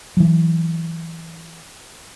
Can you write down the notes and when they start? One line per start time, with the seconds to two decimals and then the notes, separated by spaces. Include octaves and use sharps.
0.17 E3 F#3